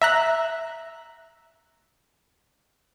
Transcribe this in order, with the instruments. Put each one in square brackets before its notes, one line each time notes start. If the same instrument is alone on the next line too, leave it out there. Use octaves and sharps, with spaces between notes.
[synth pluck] E5 A#5 F#6